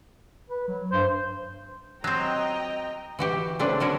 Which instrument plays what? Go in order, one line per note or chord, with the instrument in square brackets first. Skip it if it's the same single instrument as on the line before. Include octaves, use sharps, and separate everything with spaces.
[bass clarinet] B4
F#3
[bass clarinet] G2 [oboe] C5
[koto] F#3 C4 [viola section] D#5 G5 A#5
[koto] E3 F#4 G4
C#3 A3 C4 D4 B4
D3 F#3 C#4 A#4